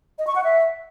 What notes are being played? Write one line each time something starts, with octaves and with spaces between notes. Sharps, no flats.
D#5
C#6
F#5
E5